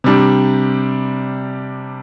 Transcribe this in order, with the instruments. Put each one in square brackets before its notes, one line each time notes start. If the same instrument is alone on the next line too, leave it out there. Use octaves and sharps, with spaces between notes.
[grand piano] C3 G3 D4